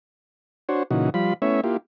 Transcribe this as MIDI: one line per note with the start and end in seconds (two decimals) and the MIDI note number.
0.69 0.83 62
0.69 0.83 66
0.69 0.83 72
0.69 0.83 73
0.91 1.10 46
0.91 1.10 49
0.91 1.10 52
0.91 1.10 63
0.91 1.10 66
1.14 1.34 53
1.14 1.34 55
1.14 1.34 65
1.14 1.34 83
1.42 1.61 57
1.42 1.61 59
1.42 1.61 61
1.42 1.61 64
1.42 1.61 73
1.42 1.61 76
1.64 1.77 58
1.64 1.77 64
1.64 1.77 65
1.64 1.77 67